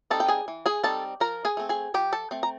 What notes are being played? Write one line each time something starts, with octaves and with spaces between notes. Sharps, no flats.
G3 C4 D#4 A4 A5
G5
G#4 G#5
E3
G#4 G#5
G3 C4 D#4 A4 A5
F3 A#4 A#5
G#4 G#5
A3 C4
G#4 G#5
F3 G4 G5
A4 A5
A3 C4
A#5